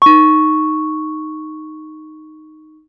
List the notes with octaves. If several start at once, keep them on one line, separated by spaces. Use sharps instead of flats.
D#4 C#6